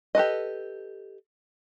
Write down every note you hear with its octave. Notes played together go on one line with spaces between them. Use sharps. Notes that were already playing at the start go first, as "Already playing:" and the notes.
G4 A4 B4 D#5